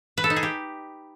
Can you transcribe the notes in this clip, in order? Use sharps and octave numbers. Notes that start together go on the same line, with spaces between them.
B4
A4
D#4
G#4
G4